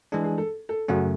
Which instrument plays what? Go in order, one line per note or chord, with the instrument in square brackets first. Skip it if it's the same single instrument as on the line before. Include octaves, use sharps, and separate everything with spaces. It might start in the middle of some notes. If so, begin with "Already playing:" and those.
[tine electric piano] E3 G#3 D4 [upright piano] G#4
[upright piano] G#4
A4
A4
[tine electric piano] F#2 C#3 F#3 A3 C#4 [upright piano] F#4